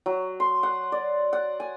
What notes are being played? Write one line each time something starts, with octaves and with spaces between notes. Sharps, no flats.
F#3
C6
F#5
D5
F#5
G#5